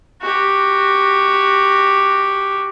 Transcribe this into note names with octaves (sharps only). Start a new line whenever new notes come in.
F#4 G4